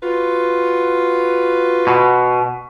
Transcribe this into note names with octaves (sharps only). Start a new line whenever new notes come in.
F4 F#4 B4
B2